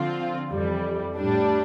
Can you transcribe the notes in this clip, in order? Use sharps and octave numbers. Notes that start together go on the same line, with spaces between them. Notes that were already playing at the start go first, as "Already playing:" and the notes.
Already playing: D3 F3 C4 F4
F2 E3 G3
A2 G3 D4